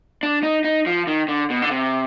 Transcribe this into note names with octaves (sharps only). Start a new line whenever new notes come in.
D4
D#4
D#4
F3
D#3
D3
B2
D3
C3